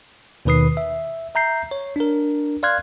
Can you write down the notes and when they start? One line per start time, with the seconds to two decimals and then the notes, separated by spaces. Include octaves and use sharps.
0.45 D#2 B2 D#3 B4 D#6 C7
0.77 E5
1.35 E5 A#5 G6 C7
1.71 C#5
1.96 D4 A#4
2.63 D5 F5 C6 F6 F#6 G#6